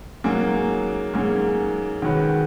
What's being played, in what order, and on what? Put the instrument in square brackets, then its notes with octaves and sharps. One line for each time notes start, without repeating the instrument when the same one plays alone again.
[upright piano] G#2 F#3 A#3 C#4 G#4
G#2 F#3 A#3 C#4 G#4
D#3 G#3 C#4 F#4 B4